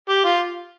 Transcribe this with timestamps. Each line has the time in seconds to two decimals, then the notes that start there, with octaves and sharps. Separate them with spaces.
0.09 G4
0.24 F4